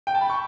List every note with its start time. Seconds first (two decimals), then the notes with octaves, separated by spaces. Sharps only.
0.07 G5
0.15 A5
0.21 B5
0.30 C#6